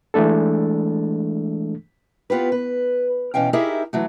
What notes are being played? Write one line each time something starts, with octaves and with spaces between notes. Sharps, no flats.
E3 G#3 A3 D4 A4
B3 F4 G4 B4
B4
B2 E3 C#4 F5 G5
D#4 E4 G4 G#4 A#4 E5
E3 F#3 A3